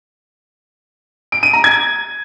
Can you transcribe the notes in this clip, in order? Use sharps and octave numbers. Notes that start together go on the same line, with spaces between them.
D7
D#7
A#5
G#6